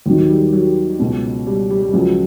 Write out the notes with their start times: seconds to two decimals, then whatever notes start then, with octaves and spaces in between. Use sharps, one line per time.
0.06 D#2 D#3 F#3
0.29 G3
0.53 F#3
1.00 C#2 B2
1.47 G3
1.70 G3
1.82 G3
1.93 C#2 C#3 F3 F#3